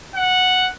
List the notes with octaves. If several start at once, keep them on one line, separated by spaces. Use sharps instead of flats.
F#5